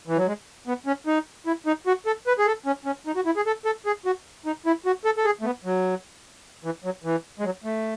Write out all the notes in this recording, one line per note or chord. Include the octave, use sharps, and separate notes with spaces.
E3
F#3
G#3
B3
C#4
D#4
E4
D#4
F#4
A4
B4
G#4
A4
C#4
C#4
D#4
F#4
E4
G#4
A4
A4
G#4
F#4
D#4
E4
F#4
A4
A4
G#4
A3
B3
F#3
E3
F#3
E3
G#3
F#3
A3